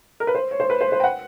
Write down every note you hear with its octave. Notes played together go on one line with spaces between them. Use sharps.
A#4
B4
C5
C#5
C5
B4
C5
C5
G5
F#5